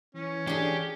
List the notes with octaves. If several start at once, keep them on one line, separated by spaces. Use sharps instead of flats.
E3 C#4
D4 G4 G#4